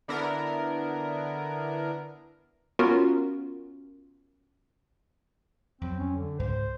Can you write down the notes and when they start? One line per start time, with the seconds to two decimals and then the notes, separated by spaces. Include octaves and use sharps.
0.08 D3 B3 D4 E4 A#4
2.79 B3 C#4 F4 F#4 A#4
5.81 F2 F#3 C4
5.99 C#4
6.16 D3
6.39 C#2 G#2 C5